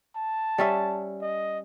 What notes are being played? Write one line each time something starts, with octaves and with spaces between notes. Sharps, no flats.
A5
G3 C#4 E5
D#5